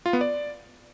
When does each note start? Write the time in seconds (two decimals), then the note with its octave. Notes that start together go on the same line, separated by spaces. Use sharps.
0.06 F4
0.13 B3
0.21 D5